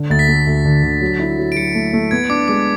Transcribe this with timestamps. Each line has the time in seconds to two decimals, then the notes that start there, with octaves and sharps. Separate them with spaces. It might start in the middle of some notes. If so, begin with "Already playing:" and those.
Already playing: D3
0.10 D2 A6
0.19 B6
0.28 A3
0.47 D2
0.65 D3
0.83 D3
1.01 F#3
1.19 E4
1.38 F#3
1.52 D7
1.56 F#3 C#7
1.75 A3
1.93 A3
2.11 B3 G#6
2.29 D4 D6
2.48 G#3 D6